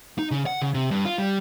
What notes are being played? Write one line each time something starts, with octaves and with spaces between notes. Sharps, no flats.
D#4
C#3
F#5
C#3
C3
G2
F4
G3